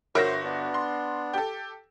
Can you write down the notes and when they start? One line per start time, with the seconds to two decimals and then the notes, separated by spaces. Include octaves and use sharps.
0.15 G1 F#4 A#4 C5 C#5 E5 A#6
0.44 B3 D4
0.74 C6
1.33 G4 A4